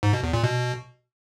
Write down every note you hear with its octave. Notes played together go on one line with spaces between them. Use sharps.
G#2
B2
E2
A#2
B2